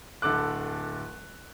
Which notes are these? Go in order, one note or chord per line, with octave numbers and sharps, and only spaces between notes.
D1 D3 A4 D6 F#6